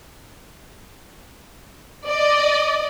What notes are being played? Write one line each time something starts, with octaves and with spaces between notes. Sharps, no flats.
D5 D#5